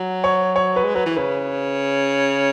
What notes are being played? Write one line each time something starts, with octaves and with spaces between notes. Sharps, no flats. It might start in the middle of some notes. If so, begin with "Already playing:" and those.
Already playing: F#3
C#5
C#5
B4
G#3
F#3 B4
E3
C#3 B4